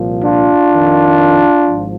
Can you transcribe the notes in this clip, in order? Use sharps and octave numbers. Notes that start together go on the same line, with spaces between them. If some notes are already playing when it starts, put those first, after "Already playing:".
Already playing: C2 A#2 F3
D4 F4
F2 D#3
G#1 G#2 F3